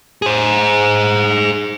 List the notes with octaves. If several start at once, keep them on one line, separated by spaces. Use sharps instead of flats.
G#4 C5